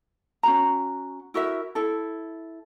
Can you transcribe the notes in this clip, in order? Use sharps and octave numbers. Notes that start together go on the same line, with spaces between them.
C#4 F#4 A#5
E4 F#4 A#4 E5
E4 A4